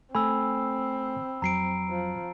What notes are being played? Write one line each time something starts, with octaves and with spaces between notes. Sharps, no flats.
A3 C4 A4 G#5 B5 E6
F2 F#3 A#5 C7 D7
F3